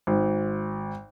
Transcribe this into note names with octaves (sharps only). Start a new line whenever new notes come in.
G#1